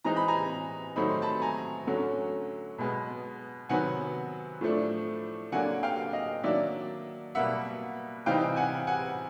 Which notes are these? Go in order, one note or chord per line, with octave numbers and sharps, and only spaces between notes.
E3 G#3 C4 D#4 A#5
B5
G#5 A#5
D#3 F#3 A3 C4 D#4 B5
C6
A5 B5
G#5 A#5
D3 F#3 A3 C#4
B2 G#3 B3
C3 D#3 F#3 B3 F#5 G#5
A2 F3 A3 D4
D3 F#3 A#3 D4 F#5 G#5
F5 G5
D#5 F5
D#3 F#3 A#3 D4 D5 E5
B2 G3 A#3 E5 F#5
C3 E3 G3 C4 D#4 F5 G5
F#5 G#5
F#5 G#5